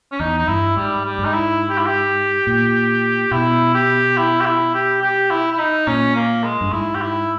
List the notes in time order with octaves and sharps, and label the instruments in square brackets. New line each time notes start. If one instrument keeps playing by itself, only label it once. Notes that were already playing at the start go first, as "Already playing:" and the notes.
[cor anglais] C#4
[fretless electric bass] E2 [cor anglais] D#4
[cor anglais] D#4
[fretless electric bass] G2 [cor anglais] E4
[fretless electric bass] G#2 [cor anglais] G3
[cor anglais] G3
[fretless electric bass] G#2
[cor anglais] D#4
E4
G4
E4
G4
[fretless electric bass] A#2
[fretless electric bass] B2 [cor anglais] E4
[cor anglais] G4
E4
G4
E4
G4
G4
E4
E4
D#4
[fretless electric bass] A#2 [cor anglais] C#4
[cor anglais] A#3
G#3
[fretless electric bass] G2
[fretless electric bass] G#2 [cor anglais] E4
[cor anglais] G4
E4